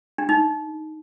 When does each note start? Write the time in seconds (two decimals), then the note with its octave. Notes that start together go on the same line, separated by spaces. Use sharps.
0.18 D4
0.29 D#4